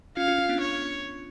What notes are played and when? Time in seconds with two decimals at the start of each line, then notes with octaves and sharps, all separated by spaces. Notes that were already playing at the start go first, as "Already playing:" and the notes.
0.17 C#4 F4 F5
0.28 C#4 F4
0.38 C#4 F4
0.49 B3 D4
0.61 C#5